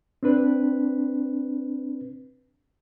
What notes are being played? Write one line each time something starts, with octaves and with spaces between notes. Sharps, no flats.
C4 D4 B4